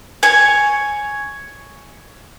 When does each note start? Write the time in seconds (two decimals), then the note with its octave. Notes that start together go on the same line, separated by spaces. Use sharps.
0.23 C#5 G#5